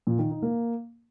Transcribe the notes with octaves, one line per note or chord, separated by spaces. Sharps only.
A#2
D#3
D#4
A#3